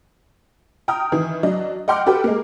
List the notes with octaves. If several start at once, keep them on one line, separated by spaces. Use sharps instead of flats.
G5 A#5 D#6 F6
D#3 E3
F#3 D4 D#5
D#5 F#5 G5 C6 D6 F6
F#4 G4 A4 B4 G5
G#3 A#3